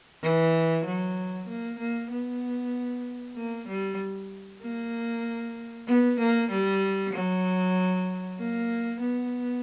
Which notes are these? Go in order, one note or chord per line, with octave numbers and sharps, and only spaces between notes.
E3
F#3
A#3
A#3
B3
A#3
G3
A#3
B3
A#3
G3
F#3
A#3
B3